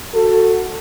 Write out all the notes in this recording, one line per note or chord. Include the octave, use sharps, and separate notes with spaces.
F#4 A4